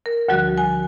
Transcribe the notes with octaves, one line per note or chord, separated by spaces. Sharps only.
A#4
D2 D3 F3 G3 F#4 F#6
G#5